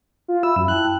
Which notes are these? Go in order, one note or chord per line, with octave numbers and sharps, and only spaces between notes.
F4
E5 B5 E6
F#2
E4 G5 A5 F#6
G5